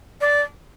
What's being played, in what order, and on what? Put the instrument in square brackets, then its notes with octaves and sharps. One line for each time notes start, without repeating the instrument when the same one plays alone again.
[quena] D5